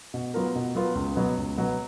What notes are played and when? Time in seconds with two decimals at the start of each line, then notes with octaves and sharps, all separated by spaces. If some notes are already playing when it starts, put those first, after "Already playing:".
0.14 B2
0.34 F#3 B3 F4 A#4
0.55 B2
0.75 F#3 B3 F4 A#4
0.95 C#2
1.16 B2 F#3 B3
1.37 C#2
1.58 B2 F#3 B3